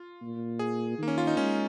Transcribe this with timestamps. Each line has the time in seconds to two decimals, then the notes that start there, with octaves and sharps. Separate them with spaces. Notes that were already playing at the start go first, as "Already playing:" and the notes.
Already playing: F4
0.21 A#2
0.59 G#4
0.98 D#3 A#3
1.08 C#4
1.18 F4
1.27 D#4
1.37 G#3 C#4